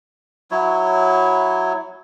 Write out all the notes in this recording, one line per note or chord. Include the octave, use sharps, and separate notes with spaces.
F#3 E4 C#5